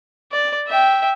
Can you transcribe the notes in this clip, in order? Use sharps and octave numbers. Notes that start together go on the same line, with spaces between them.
D5
E5 G5